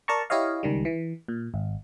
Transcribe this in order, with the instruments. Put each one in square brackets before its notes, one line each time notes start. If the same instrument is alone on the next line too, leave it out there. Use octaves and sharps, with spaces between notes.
[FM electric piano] A#4 D5 A5 A#5 C#6
E4 G4 C#5 D#5 F5
C#2 D#3 G3
E3
A#2
G#1